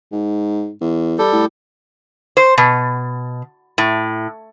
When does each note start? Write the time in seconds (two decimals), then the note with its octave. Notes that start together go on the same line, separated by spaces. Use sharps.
0.12 G#2
0.81 E2
1.18 G3 A4
1.33 A2
2.37 C5
2.58 B2
3.78 A2